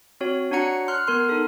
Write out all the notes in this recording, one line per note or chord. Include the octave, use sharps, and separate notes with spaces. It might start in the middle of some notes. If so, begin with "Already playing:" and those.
C4 F#4 C#5
D4 F#4 C#5 F#5 A#5 C#7
C6 F6 F#6
B3 A#4 C6 F6
D#4 A4